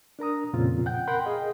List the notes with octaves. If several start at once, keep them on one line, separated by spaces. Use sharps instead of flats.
D4 A#4 A#5 D#6
F2 A#2 C#3 C4 F4
F#5 G5 G6
A#4 F#5 G5 B5 C6
G#4 D#5 F5 G5